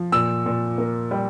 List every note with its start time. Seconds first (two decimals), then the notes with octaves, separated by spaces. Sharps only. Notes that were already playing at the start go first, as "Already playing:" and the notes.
Already playing: F3
0.12 A#2 E6
0.46 A#2
0.78 A#3
1.11 G3